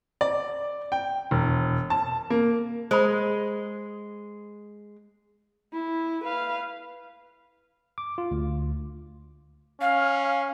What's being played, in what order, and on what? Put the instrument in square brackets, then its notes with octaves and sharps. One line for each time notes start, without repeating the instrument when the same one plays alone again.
[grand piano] D5
G5
E1
A5
A#3
[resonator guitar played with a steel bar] G#3 [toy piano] C5 B5
[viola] E4
B4 F5
[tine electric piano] D6
F4
D2
[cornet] C#4 [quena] F5